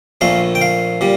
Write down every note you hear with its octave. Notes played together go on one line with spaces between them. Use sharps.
A#1 A#2 A3 F5
G5
F5
A#2 G3